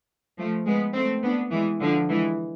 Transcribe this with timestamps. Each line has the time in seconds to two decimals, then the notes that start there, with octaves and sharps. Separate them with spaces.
0.38 F3 A3
0.66 G#3 B3
0.94 A3 C4
1.23 B3 D4
1.51 E3 G#3
1.81 D3 F3
2.09 E3 G#3